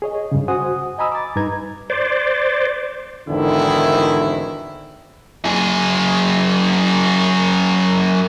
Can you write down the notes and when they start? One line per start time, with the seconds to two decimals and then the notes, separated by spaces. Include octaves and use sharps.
0.02 G#4 C#5 D#5
0.32 G2 C#3
0.48 F#4 C5 F#5 G#5 D#6
0.98 D#5 G#5 A#5 B5 D#6 E6
1.12 D6 A6
1.36 G2 D#4 B4 A#5 G#6
1.90 C5 D5
3.28 G#1 E2 D3 D#3 C4 E4
5.45 F#2 G#4